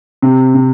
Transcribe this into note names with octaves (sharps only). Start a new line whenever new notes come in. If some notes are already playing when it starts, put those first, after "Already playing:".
C3
C3